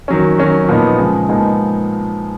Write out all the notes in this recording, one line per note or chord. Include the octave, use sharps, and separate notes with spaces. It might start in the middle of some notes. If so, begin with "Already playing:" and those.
D#3 F#3 C#4
D#3 F#3 C#4
A#2 F3 B3 D#4
C#3 F3 G#3
A#2 F3 G#3 B3 D#4